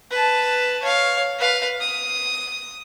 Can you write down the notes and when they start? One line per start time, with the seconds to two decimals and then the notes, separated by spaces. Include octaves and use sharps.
0.11 B4 A5
0.83 C#5 F5
1.39 B4 F5
1.80 D#6